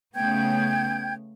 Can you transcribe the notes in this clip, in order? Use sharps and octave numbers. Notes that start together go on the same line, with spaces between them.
C#3 A3 B3 G5 G6 G#6